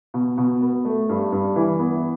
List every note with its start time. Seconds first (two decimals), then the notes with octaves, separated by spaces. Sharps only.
0.14 B2
0.38 B2
0.62 B3
0.85 A3
1.09 G2
1.32 G2
1.56 E3
1.79 B3